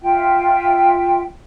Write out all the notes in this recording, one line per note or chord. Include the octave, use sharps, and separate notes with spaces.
F4 E5 G5